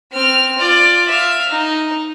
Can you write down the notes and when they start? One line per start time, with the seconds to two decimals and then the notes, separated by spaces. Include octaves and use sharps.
0.12 C4 F6
0.58 F4 D5
1.08 E5 F5
1.49 D#4